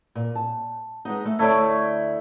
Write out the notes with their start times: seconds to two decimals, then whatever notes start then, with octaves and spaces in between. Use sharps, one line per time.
0.15 A#2
0.35 A5
1.05 G#3 B3 D#4
1.25 A3
1.39 D2 A3 E4 C#5 D5